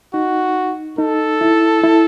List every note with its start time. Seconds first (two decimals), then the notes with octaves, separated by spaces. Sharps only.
0.13 D#4 F#4
0.98 D#4 A4
1.41 E4
1.83 E4